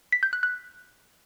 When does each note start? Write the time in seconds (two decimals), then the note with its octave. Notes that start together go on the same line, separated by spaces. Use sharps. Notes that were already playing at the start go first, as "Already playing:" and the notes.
0.12 B6
0.23 G6
0.33 F#6
0.43 F#6